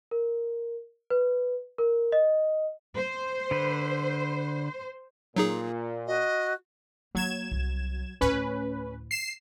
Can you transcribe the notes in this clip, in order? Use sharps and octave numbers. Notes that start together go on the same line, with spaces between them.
A#4
B4
A#4
D#5
C5
D3 B4
A#2 F#3 D#4 G#4
F#4 D#5
F#3 A#3 G#6 E7
C2
D2 A2 C#4 B4
C7 E7